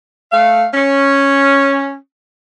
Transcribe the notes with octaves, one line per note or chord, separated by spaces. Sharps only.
A3 F5
C#4